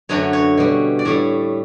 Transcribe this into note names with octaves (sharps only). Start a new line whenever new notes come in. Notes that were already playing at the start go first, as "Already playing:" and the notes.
F#2 D3 F#3 A3 C#5
C#5
B2 G3
D5
A2 G3 C#5